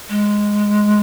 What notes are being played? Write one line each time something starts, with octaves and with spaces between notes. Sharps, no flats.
G#3